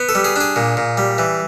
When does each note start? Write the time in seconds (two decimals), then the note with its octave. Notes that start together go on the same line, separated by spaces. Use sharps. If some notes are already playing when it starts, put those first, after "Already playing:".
Already playing: B3
0.09 A4
0.15 G3
0.24 G#4
0.36 D4 G#4
0.56 A#2
0.77 A#2
0.97 G3
1.18 E3